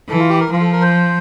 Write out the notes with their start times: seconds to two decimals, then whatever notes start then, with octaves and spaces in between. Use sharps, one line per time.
0.09 E3 A4
0.19 F4
0.29 G4
0.40 A#4
0.51 F3 F4
0.61 A4
0.72 A#4
0.82 C5